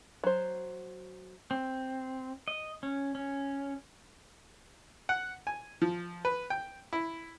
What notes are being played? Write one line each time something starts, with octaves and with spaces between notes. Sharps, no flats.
F#3 C5
C4
D#5
C#4
C#4
F#5
G#5
F3
B4
G5
E4